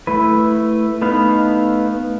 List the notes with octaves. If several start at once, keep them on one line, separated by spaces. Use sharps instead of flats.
A3 E4 B4
A3 B3 D#4 B4 F5